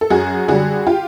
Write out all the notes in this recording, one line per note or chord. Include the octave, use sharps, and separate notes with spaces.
A4
F#2 F#4 G#4
D3 G3 F#4 G#4
F4 G4